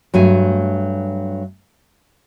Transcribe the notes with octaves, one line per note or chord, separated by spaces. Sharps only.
G2 F#3 A3 G#5